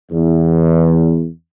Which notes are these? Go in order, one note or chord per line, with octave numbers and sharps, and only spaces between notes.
E2